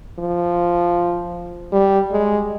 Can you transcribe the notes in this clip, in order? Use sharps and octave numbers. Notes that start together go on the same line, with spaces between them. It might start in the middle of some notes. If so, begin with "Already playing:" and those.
F3
G3
G#3